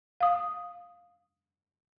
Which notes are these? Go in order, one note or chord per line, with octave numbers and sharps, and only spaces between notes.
F5 D#6